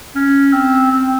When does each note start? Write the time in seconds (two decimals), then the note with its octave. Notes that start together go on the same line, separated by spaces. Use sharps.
0.15 C#4
0.53 C4
0.91 C4